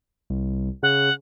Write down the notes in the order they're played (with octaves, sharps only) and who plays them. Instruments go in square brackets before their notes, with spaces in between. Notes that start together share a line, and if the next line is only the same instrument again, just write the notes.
[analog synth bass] C2
[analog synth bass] C#3 [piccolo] F#5